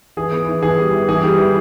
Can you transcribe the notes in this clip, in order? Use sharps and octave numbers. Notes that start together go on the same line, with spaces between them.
E3 G#4
B3
E3
E3 G#4
G3
E3
E3 G#4
G3
E3